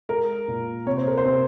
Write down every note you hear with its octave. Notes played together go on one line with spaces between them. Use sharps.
G#3 A#4
A#2
C3 C#5
C5
A#4
C5
C3